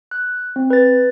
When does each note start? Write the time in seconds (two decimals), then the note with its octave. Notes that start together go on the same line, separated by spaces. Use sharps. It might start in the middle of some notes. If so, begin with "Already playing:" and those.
0.11 F#6
0.56 C4
0.70 B4 A6